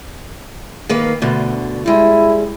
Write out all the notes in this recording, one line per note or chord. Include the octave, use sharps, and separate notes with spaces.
D#3 A#3 B4
D2 B2 D3
G3 G#3 E4